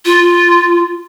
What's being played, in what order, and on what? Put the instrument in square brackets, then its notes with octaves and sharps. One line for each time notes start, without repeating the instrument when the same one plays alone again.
[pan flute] F4